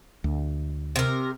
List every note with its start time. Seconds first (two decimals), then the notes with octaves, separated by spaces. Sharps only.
0.24 D2
0.96 C3 A#4